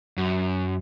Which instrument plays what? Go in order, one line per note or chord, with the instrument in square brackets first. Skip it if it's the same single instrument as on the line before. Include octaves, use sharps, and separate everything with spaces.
[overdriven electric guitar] F#2